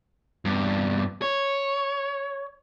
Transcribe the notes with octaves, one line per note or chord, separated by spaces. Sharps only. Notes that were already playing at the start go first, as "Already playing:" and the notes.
E2 G2
C#5